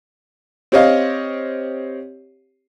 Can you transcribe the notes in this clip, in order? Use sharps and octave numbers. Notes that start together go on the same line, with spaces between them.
C4 G4 C#5 D#5 F5